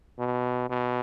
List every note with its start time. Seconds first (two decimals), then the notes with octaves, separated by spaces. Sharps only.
0.19 B2
0.69 B2